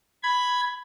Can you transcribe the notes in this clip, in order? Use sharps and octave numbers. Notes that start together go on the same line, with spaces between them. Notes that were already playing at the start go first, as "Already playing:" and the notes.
B5 G#6